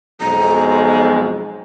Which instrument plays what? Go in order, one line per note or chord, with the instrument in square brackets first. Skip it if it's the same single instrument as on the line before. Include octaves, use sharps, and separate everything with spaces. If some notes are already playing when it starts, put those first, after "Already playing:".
[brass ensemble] B1 F2 G#3 [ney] A#5